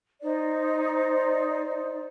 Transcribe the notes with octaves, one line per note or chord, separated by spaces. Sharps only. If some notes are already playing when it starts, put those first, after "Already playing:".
D#4 C5 D5